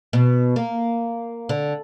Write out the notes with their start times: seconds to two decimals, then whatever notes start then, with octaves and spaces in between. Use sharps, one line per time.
0.13 B2
0.56 A#3
1.49 D3